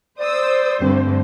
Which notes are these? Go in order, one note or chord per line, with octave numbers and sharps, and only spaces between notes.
C5 D5 D#6 E6
G2 D3 A3 C4